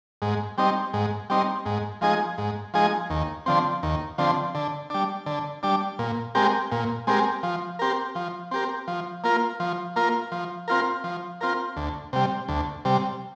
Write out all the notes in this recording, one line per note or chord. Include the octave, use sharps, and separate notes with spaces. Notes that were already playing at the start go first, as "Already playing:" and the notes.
G#2
G3 C4 D#4
G#2
G3 C4 D#4
G#2
F3 G#3 D#4 G#4
G#2
F3 G#3 D#4 G#4
D#2
D3 F3 C4
D#2
D3 F3 C4
D3
G3 D4
D3
G3 D4
A#2
G#3 C4 G4 A#4
A#2
G#3 C4 G4 A#4
F3
C4 G4 A#4
F3
C4 G4 A#4
F3
A#3 F4 A#4
F3
A#3 F4 A#4
F3
C4 F4 A#4
F3
C4 F4 A#4
D2
C3 G3
D2
C3 G3